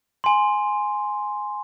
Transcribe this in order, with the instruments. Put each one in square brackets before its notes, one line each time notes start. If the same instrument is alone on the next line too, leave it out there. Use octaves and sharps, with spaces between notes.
[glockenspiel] G#5 C6